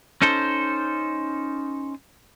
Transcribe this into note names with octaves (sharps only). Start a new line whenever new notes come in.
C#4 D#4 A4 C5